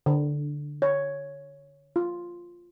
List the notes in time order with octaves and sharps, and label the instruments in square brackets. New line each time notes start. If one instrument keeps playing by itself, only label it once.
[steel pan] D3
C#5
F4